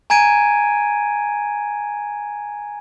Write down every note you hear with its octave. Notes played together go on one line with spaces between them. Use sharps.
G#5 A#5 G#6 D7 D#7